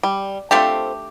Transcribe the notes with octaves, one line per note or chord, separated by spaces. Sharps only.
G3
A3 C4 D4 F4 G4 A4